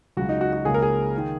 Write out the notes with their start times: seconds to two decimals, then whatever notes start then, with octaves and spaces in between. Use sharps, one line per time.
0.17 C#2 C#3 F#3 F#4
0.29 D#4
0.41 F#4
0.53 F#4
0.65 C#2 C#3 A#3 G#4
0.74 A#4
0.82 G#4
1.18 D#3